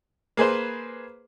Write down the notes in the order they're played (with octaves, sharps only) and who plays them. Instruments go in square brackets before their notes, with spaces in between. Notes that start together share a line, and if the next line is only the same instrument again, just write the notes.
[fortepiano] A#3 G#4 B4 C5